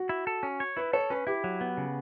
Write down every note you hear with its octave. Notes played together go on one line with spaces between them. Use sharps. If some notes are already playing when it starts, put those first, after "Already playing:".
Already playing: F#4
E4
A4
C#4
C#5
E4 B4
A4 C#5
C#4 B4
E4 G4
F#3
B3
C#3